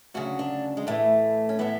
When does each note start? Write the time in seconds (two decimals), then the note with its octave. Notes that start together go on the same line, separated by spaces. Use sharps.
0.14 D2 C#3 F#3 F#4
0.39 D4
0.77 G#3
0.87 A2 E3 A3
1.49 C#4
1.59 A2 E3 B3